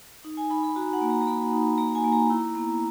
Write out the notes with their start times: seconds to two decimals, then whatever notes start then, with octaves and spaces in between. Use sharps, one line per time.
0.25 D#4
0.37 G#5
0.50 D#4 B5
0.63 B5
0.76 F#4 A#5
0.93 F#5
1.01 A#3
1.10 A#5
1.21 A#5
1.27 A#3 B5
1.53 D#4
1.78 A#3 A#5
1.95 G#5
2.04 A#3
2.12 A#5
2.30 E4
2.55 B3